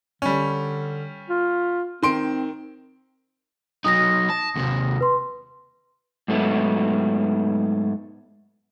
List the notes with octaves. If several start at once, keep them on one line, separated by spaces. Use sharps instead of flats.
D3 G3 C#4
F4
D#3 C4 C6 D7
F#3 D#4 D#6 A#6
A5
D#2 C3
B4 C6
G#2 F#3 A3 B3